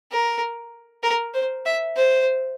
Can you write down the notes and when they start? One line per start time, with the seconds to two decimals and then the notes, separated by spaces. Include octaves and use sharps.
0.12 A#4
1.03 A#4
1.34 C5
1.65 E5
1.96 C5